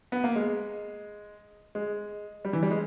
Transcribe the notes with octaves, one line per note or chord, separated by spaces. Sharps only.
B3
A#3
G#3
G#3
G3
E3
G3
G#3